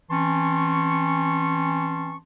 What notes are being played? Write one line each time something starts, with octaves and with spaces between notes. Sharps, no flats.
E3 C4 C#4 A5 C6 C#6